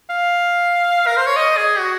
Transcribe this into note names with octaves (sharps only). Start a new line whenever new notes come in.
F5
A#4
C5
C#5
D#5
G#4
F#4